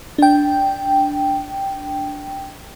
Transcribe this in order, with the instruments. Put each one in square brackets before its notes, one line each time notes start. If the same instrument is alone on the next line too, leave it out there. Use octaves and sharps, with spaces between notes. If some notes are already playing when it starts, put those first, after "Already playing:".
[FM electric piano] D4 G5